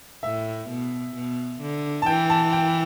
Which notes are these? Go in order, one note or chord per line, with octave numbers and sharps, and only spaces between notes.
A2 E5
B2
B2
D3
A5
E3 G5
A5
G5